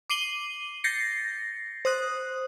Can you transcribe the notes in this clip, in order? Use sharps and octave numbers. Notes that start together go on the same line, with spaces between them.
D6 C7 D#7 F#7 G7
G6 A6 A#6 C7 C#7
C5 D#6 F#6